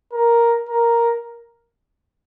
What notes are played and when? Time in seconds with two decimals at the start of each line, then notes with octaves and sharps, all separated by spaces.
0.13 A#4
0.69 A#4